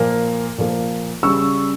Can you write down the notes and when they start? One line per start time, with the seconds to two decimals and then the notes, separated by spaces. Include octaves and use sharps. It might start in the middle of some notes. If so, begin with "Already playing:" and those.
Already playing: A#2 F3 A#3
0.58 A#2 F3 A#3
1.23 C#3 G3 C#4 C#6 E6